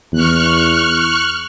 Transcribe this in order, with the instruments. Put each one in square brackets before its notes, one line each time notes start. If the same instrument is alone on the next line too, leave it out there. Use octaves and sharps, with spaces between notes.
[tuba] E2 [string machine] C#6 F6 F#6